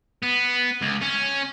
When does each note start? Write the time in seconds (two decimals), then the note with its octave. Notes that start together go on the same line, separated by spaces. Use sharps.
0.23 B3
0.81 C#2
1.02 C#4